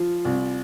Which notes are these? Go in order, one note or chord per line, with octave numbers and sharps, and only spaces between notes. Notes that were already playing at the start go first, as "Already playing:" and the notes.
Already playing: F3 F4
C2